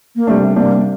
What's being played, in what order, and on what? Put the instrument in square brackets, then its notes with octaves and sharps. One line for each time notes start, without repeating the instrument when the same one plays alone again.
[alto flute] A#3
[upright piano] C3 G3 D4 [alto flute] A3
[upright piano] C3 G3 D4 [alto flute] A#3